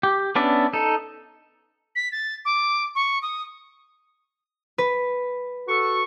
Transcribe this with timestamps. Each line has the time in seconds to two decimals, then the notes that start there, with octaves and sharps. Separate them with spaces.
0.03 G4
0.36 B3 C#4 D4 D5 E5
0.73 D#4 A4
1.95 B6
2.12 A6
2.45 D6
2.95 C#6
3.22 D#6
4.78 B4
5.67 F#4 A4 C#6